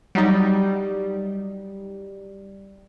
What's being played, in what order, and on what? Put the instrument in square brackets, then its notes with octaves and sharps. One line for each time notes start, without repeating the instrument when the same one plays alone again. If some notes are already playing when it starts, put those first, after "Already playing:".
[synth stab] F#3 D#4 [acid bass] G3